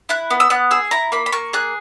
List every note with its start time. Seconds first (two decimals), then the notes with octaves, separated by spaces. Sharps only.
0.09 E4 F#6
0.30 B3
0.40 E6
0.50 B3 F#6
0.71 G#4 E6
0.91 E4 A#5
1.12 A#3 B5
1.26 B5
1.32 A#3 C#6
1.53 G#4 F#6